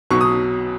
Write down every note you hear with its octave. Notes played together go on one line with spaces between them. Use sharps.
B1 B2 F#3 C#6
D#6